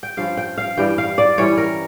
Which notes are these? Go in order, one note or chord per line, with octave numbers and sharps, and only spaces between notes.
G5
G2 F3 C#4 F5
G5
F5
G2 E3 G3 G5
F5
D5
E3 G3 C#4 C#5
A#4